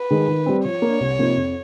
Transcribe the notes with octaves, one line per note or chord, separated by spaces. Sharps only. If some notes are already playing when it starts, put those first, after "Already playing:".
Already playing: B4
D#3 G#3
D#3
G3 C4
F3 C#5
A#3
D4
C2
C3 F3 A#3 D#4
F2